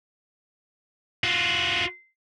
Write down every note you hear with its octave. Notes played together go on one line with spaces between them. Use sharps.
F4 F#4